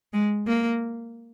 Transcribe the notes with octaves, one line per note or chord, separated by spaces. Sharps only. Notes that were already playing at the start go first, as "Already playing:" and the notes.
G#3
A#3